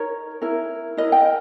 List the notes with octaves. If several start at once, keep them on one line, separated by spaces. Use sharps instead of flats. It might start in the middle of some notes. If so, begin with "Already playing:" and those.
Already playing: D#4 A#4 C#5
E4 A#4
E4 A#4 D#5
G5